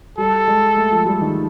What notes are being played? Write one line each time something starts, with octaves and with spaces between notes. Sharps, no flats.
G3 A4
G#3
A3
F3
G3
D#3